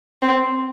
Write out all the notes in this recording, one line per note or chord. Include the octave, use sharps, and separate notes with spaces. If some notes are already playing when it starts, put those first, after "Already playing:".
C4